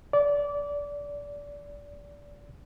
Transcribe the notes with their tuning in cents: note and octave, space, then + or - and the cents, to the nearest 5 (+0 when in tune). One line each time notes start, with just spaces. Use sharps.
D5 -25